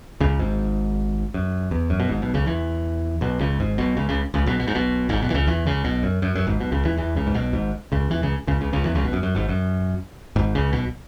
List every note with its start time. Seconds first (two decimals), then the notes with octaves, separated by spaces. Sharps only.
0.20 C#2 C#3
0.39 G#1 G#2
1.34 F#2
1.71 E2
1.90 F#2
2.00 B2
2.09 G#1 G#2
2.22 B1 B2
2.34 C#2 C#3
2.46 E2 E3
3.21 B1 B2
3.41 C#2 C#3
3.59 G#1 G#2
3.78 B1 B2
3.97 C#2 C#3
4.09 C#2 C#3
4.34 C#2 C#3
4.46 B1 B2
4.60 B2
4.68 G#2
4.75 B1 B2
5.09 G#1 G#2
5.22 B1 B2
5.30 E3
5.34 C#2 C#3
5.47 E2 E3
5.66 C#2 C#3
5.84 B1 B2
6.03 F#2
6.22 F#2
6.35 F#2
6.47 G#1 G#2
6.59 B1 B2
6.72 C#2 C#3
6.85 E2 E3
6.97 E2 E3
7.16 C#2 C#3
7.27 G#2
7.34 B1 B2
7.53 G#1 G#2
7.92 C#2 C#3
8.10 E2 E3
8.22 C#2 C#3
8.47 C#2 C#3
8.61 C#2 C#3
8.73 C#2 C#3
8.85 E2 E3
8.95 C#2 C#3
9.04 B1 B2
9.13 F#2
9.23 F#2
9.35 G#1 G#2
9.49 F#2
10.36 G#1 G#2
10.55 C#2 C#3
10.73 B1 B2